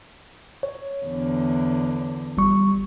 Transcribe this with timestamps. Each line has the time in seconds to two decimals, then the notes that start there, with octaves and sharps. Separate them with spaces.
0.63 C#5
1.06 E2 D3
2.37 G1 G3 C#6